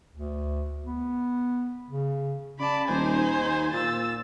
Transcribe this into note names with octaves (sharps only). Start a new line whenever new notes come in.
D2
B3
C#3
C#3 D5 A5 B5
D#1 D#4 C5 G#5
D#2
A#2 E6 A6